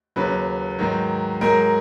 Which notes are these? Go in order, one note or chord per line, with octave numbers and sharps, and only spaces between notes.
D#2 C#3 F#3 B4
G#2 D#3 F#3
G#2 F#3 A#4